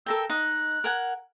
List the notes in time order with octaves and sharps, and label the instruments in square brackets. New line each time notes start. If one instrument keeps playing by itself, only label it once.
[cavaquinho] A4 A#4 G5 [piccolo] E6
[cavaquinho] D#4 [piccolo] F#6
[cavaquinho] A#4 F#5 G#5